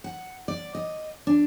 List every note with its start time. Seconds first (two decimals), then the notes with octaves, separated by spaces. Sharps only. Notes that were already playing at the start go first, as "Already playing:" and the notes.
0.04 F#5
0.48 D5
0.75 D#5
1.27 D4